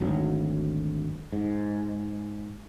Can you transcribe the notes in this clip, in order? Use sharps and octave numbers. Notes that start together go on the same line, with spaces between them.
G#1 D2 F#3
G#2